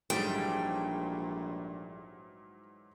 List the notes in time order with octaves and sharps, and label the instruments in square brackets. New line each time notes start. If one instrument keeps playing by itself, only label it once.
[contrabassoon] A#1 [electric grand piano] G#2 E3 F#3 [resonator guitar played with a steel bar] G3 A3 G#4 [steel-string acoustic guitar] G5